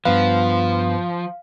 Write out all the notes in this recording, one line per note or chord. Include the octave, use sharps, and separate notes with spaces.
G2 F3 B3 B4 F5